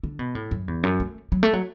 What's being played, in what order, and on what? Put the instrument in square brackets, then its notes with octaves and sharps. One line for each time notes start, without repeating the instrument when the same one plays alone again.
[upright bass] D3
B2
A2
F#2
E2
F#2
A3
F#3
A3
F#3